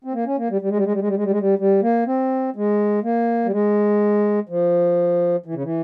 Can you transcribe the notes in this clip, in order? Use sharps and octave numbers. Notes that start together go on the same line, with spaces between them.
C4
A#3
C#4
A#3
G3
G3
G#3
G3
G#3
G3
G#3
G3
G#3
G3
G#3
G3
G3
A#3
C4
G#3
A#3
G3
G#3
F3
E3
C#3
E3